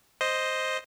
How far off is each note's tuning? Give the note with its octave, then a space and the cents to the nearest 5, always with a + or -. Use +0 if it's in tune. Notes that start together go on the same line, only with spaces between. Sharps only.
C5 +0 D#5 +0